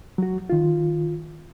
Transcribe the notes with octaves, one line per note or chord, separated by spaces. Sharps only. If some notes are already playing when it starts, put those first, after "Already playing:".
F#3 F#4
D#3 F4